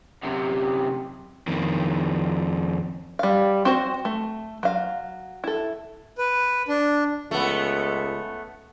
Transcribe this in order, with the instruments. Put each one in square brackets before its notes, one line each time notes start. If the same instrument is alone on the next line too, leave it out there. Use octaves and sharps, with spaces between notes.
[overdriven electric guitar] F#2 C3
F2 D#3
[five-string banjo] G3 F5
C4 F#4 C5
A3
F#3 F5
E4 A4
[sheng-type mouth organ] B4
D4
[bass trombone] C#2 [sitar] A3 B3